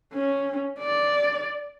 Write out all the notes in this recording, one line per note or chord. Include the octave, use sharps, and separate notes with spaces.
C#4
D5